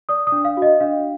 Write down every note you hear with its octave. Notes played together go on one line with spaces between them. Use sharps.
D5 D#6
D#6
D4
F5
F#4
D#5
D4 F5